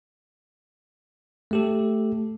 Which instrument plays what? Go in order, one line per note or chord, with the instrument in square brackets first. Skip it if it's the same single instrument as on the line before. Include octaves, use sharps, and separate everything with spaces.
[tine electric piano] A3 G4 A4